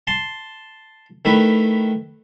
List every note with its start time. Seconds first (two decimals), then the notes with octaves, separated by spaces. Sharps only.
0.07 A5 C6
1.25 D#3 A3 E4 B4